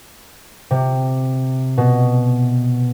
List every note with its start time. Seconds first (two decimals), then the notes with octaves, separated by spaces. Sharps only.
0.71 C3
1.78 B2